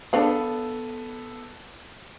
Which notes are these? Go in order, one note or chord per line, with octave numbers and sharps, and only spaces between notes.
B3 D4 A4 D5 F5